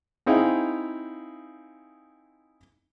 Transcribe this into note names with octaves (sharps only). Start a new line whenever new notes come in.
C4 D#4 E4 G#4 F5 G5